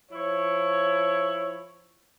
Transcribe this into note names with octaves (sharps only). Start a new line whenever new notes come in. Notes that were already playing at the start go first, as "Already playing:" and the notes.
F3 E4 C#5